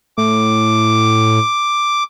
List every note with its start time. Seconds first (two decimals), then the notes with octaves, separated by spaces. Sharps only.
0.18 A2 D6